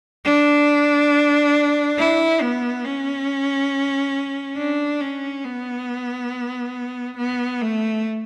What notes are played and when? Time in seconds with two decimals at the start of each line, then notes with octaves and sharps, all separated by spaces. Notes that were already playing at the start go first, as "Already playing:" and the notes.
0.25 D4
1.98 E4
2.41 B3
2.85 C#4
4.57 D4
5.01 C#4
5.45 B3
7.17 B3
7.61 A3